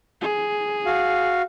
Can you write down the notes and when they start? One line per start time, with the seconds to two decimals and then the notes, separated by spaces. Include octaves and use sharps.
0.22 G#4
0.86 F#4 F5